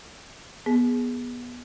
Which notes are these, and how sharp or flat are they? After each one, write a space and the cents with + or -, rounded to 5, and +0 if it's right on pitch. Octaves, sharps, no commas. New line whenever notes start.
B3 -15 G#4 +0